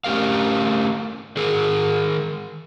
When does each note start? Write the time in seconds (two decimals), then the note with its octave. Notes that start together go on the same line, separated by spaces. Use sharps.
0.04 A3 C#4 G4 A#4 F5
1.37 D#3 G#4 A#4